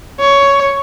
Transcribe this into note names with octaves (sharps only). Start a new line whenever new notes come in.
C#5